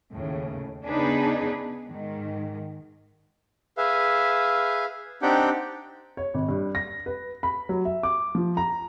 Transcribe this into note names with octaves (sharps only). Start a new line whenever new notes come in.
D#2 A2 C#3
C#3 B3 D4 D#4 G#4 B4
G#2 D#3
G#4 B4 E5 F5
C4 D4 D#4 G4 F#5 G5
C#5
G#1
G2
A#6
B4
B5
F#3
E5
D6
F3
A#5